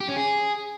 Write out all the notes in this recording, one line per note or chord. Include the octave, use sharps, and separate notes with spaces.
G4
C#4
G#4